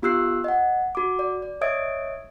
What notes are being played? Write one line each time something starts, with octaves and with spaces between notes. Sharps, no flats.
B3 F4 G4 E6 F#6 C7
D#5 F#5
F#4 D6
D5
D5
C#5 D#5 E5 D#6 G#6 D7